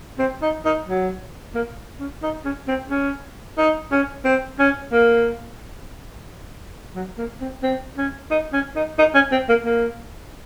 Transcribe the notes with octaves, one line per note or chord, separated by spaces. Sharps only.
C4
D#4
D#4
F#3
A#3
C#4
D#4
C#4
C4
C#4
D#4
C#4
C4
C#4
A#3
F#3
A#3
C4
C4
C#4
D#4
C#4
D#4
D#4
C#4
C4
A#3
A#3